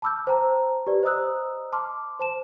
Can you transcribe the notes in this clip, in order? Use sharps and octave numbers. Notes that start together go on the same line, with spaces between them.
A5 B5 D6 E6 F6 G6
C5 G5 A5 A#5
G4 B4 D5
C5 D#5 A#5 D#6 E6 F#6
A5 C6 D6 F6
C5 A5 E7